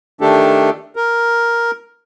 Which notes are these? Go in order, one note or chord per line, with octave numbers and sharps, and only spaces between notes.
D#3 A3 D4 G4 A4
A#4